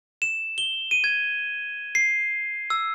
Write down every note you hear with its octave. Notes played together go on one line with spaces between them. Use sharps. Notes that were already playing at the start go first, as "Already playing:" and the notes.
E7
G7
D#7
G#6
C7
E6